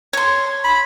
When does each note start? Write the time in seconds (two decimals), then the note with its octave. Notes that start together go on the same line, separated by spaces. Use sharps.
0.13 C#5 C6
0.64 B5